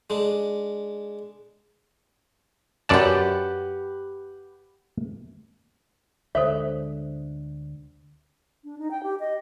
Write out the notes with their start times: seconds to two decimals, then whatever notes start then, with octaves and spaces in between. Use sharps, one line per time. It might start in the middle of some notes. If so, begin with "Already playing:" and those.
0.10 G#3 D4
2.89 F#2 G4 B4 D5 F#5 A5
6.35 D2 D3 G#3 A4 C5 C#5 E5
8.64 D4
8.78 D#4
8.91 G5
9.03 G4
9.20 D#5